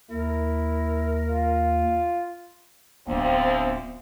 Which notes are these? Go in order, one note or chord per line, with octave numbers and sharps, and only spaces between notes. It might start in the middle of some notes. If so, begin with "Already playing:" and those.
D#2 E4 A#4
F4
D1 D2 F3 B3 C4